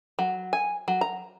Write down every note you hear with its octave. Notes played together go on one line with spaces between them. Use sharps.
F#3
G#5
F#3
A#5